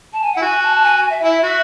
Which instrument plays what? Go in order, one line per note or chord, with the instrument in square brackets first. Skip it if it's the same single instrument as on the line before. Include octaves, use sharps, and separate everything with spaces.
[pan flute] A5
G#5
F#5
[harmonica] E4
[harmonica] F#4 [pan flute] G#5
[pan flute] A5
A5
G#5
G#5
E5
[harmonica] E4 [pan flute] E5
[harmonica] F#4 [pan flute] E5